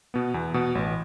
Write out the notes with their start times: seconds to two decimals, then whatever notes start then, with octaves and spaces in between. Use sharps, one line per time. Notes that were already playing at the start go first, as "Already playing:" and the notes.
0.14 B2 B3
0.34 E2
0.54 B2 B3
0.75 A1